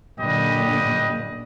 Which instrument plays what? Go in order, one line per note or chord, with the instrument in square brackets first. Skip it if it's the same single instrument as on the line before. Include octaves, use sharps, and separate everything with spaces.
[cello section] F#2 A#2 D3 [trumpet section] G4 B4 D#5